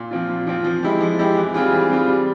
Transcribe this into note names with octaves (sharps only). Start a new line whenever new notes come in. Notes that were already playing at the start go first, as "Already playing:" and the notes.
Already playing: A#2
F3 C4 F4
A#2
F3 C4 F4
F3
G#3 E4 G4
F3
G#3 E4 G4
E3
G3 C4 F4 G#4
E3
G3 C4 F4 G#4
G3